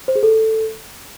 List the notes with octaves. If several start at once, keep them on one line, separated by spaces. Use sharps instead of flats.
C5
G#4
A4